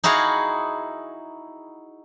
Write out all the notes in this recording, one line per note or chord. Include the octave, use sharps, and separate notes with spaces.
D#4 E4 F#4 G#4 F5 F#5